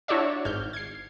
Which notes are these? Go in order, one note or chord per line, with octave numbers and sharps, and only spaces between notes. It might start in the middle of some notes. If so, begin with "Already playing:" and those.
D4 E4 F#4 C#5 D5 E5
G#1 F6 G6
G#6 C7